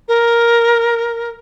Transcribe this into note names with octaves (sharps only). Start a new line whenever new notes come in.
A#4